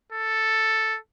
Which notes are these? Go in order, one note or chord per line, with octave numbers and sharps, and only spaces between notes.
A4